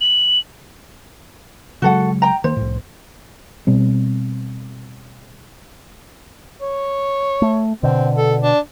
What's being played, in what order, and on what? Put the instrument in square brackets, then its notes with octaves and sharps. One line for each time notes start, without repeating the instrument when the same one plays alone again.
[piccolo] F#7
[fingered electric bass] C#3 F#3 G#3 [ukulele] F#4 A4 F#5
[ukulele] G5 A#5
[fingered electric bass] D#3 A#3 [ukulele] C5
[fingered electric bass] C2 A2
B2 G3 C4
[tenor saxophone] C#5
[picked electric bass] A3
[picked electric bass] B2 D3 [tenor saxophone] C4
[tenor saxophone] A4
D4